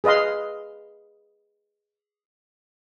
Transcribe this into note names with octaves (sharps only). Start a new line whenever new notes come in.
G#4 B4 D#5 F5 C6